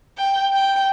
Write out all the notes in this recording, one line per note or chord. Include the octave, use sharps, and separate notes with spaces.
G5
G5